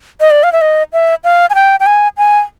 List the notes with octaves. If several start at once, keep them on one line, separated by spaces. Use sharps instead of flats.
D#5
D5
F5
E5
D#5
E5
F5
G#5
G5
G5
G#5
G#5